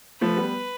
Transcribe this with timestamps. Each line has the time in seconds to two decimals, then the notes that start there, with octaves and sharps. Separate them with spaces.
0.21 F3 A3 B4
0.37 G3 B3